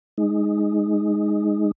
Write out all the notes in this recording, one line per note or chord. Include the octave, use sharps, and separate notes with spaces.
G#3 D#4